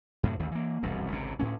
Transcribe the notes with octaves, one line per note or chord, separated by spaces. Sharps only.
F#2 A2 C3
A1 D#2 D#3
E3 A#3
E1 C2 F#2
G#1 C#2 C3
D2 A2 A#3 C#4